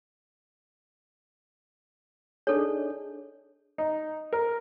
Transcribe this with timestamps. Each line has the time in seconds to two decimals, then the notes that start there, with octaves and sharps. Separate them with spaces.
2.47 D4 D#4 G#4 A4 C#5
3.78 D#4
4.33 A#4